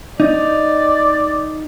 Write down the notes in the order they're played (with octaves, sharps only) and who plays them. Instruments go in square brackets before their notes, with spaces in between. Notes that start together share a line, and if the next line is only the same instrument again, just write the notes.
[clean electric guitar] D#4 [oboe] D5